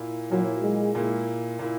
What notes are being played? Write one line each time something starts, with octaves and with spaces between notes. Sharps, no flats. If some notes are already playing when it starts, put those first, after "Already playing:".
Already playing: A#2 A#3 E4
A#2 F#3 A#3 E4
G#3
A#2 A#3 E4
A#2 A#3 E4